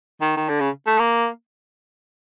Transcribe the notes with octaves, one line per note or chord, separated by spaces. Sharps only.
D#3
D#3
D3
C#3
A3
A#3